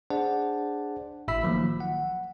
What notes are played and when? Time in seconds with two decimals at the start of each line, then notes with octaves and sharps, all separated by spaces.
0.10 D4 G#4 C5 D5 F#5 A5
1.28 G#1 A2 E5 B5 E6 B6
1.43 D#3 F3 F#3 A#3
1.80 F#5